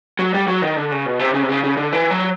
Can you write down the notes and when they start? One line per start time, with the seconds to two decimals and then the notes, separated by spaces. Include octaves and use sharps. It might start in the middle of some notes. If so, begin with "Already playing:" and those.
0.19 F#3
0.34 G3
0.48 F#3
0.62 D#3
0.76 D3
0.92 C#3
1.06 B2
1.19 C3
1.34 C#3
1.43 C3
1.49 C#3
1.64 C#3
1.77 D3
1.92 E3
2.11 F#3